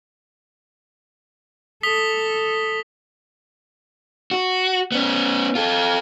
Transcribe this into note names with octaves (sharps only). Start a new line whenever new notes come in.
A4 D#6 B6 G7
F#4
B3 C#4
F4 A4